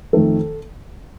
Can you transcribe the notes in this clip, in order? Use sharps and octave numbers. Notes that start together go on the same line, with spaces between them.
F2 D#3 A3 A4